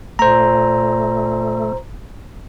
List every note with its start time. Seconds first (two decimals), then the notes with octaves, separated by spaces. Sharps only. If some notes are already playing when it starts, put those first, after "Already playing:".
0.19 A#2 A3 C5 A#5